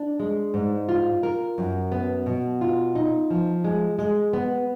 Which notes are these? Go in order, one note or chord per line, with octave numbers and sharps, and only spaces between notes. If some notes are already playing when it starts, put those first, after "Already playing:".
Already playing: D4
G#3
G#2
F4
A#4
F#2
B3
B2
F4
D#4
F3
G#3
G#3
B3